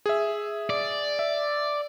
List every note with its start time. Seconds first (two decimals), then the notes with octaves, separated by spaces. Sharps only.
0.06 G#4 E5
0.70 D5
1.19 E5